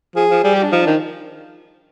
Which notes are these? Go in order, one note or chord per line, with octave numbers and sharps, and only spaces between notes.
F3 G#4
F3
G3 G#4
G4
D4
F3 D#4
D4
D#3